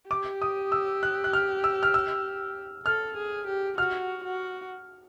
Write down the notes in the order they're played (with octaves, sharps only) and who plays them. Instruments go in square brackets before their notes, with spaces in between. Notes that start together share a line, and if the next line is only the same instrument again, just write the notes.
[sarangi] G4 [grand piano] D6
[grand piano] D#6
E6
F#6
F#6
F6
E6
F6
E6
[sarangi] A4 [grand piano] F6
[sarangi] G#4
G4
[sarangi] F#4 [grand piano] F6
[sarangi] F#4